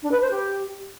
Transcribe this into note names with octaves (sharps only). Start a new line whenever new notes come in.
D4
B4
C5
G4